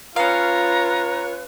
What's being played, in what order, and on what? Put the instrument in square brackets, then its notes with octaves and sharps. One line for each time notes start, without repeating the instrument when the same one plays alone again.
[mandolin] C#4 F5 [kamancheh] F4 C#5 [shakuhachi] B4 [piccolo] A#5